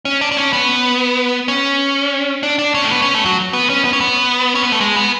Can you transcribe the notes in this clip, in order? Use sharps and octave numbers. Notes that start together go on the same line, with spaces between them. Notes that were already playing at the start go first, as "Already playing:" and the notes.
C#4
D4
D4
C#4
B3
C#4
D4
D4
C#4
A3
B3
C#4
A3
F#3
B3
C#4
B3
C#4
B3
C#4
B3
A3
G#3
B3